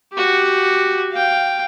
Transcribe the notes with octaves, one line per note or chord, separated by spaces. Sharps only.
F#4 G4
F5 G5